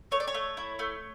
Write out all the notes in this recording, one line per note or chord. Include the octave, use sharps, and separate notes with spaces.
A3 C#5
D5
C#5
A3
E4
A3